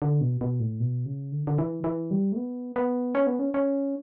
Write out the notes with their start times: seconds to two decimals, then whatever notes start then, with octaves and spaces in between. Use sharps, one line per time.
0.02 D3
0.21 B2
0.41 B2
0.60 A2
0.80 B2
1.06 C#3
1.32 D3
1.47 D3
1.58 E3
1.84 E3
2.11 G3
2.32 A3
2.36 B3
2.76 B3
3.15 C#4
3.27 B3
3.39 C#4
3.54 C#4